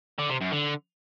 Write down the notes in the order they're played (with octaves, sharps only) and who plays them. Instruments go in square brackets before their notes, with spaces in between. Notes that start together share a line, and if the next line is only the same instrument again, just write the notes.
[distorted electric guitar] D3
C3
F#2
D3